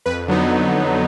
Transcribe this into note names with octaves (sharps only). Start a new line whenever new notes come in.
F2 B4
D3 F#3 B3 D#4